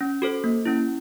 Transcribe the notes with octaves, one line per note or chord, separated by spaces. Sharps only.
C#4
F#4 A4 C5
A#3
C#4 E4